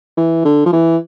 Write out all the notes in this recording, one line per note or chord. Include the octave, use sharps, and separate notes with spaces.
E3
D3
F3
E3